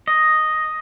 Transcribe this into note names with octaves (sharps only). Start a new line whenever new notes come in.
D#5